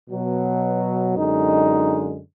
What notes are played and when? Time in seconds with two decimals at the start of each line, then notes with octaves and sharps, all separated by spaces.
0.10 B2 F#3
1.15 F#2 D3 G#3 D#4